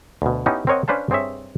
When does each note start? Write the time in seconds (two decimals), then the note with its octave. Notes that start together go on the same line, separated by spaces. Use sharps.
0.22 D2 B2
0.46 B3 C#4 D#4 E4 G4
0.67 C4 A#4 C#5 D#5 F#5
0.88 C#4 D4 B4 C5 F5 A5
1.10 G2 C4 G#4 C#5 E5